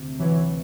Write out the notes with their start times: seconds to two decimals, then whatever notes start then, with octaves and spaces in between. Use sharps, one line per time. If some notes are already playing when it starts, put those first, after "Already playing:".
Already playing: D2 C3
0.19 E3 F#3